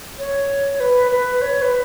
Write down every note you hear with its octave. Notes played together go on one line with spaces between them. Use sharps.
C#5
B4
B4
C#5
B4